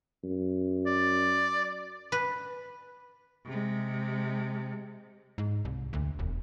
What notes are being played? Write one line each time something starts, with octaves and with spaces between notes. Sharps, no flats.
F#2
D5
B4
C3 G#3
G#2
C2
D2
E1